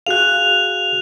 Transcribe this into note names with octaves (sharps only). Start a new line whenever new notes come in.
F#4 G#4 F5 F#6 F7